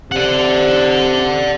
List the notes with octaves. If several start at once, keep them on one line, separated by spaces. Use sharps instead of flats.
C3 D5 F#5